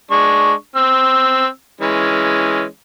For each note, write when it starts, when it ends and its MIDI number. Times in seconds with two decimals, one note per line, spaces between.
0.11 0.53 56
0.11 0.53 62
0.11 0.53 85
0.76 1.46 60
0.76 1.46 88
1.81 2.64 52
1.81 2.64 56
1.81 2.64 61